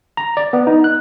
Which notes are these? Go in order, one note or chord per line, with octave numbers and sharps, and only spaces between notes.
A#5
D5
B3
D#4
F#6